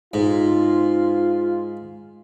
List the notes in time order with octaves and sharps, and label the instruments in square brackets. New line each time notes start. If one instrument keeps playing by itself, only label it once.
[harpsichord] G#2 [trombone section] F4